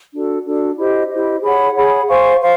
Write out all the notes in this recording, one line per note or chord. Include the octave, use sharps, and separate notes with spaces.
D4 F#4 A4
D4 F#4 A4
E4 G4 C5 D#5
E4 G4 C5 D#5
G#4 C#5 F#5 B5
G#4 C#5 F#5 B5
C5 F5 G#5 C#6
C5 F5